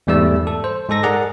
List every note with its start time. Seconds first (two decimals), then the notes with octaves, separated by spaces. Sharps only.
0.07 E2 G#2 G3 A3 D5 E6
0.47 A4
0.64 C5
0.89 G#2 D#4 A4 A#6
1.03 G#4 A#4 D5 F#5 A#5